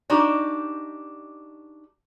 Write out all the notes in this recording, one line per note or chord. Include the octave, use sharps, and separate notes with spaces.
D4 D#4 F#4 G4